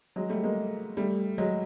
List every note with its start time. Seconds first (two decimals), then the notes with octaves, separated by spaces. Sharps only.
0.16 F#3 G#3
0.30 G3 A3
0.44 G#3 A#3
0.97 G3 A3
1.38 F#3 G#3